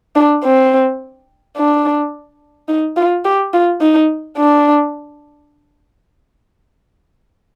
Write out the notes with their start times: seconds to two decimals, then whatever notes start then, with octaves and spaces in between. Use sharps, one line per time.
0.16 D4
0.44 C4
1.57 D4
2.68 D#4
2.97 F4
3.25 G4
3.53 F4
3.81 D#4
4.38 D4